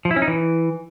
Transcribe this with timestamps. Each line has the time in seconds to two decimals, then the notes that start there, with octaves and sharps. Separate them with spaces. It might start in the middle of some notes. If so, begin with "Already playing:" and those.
0.05 F3
0.11 E4
0.16 C#4
0.22 D#4
0.28 E3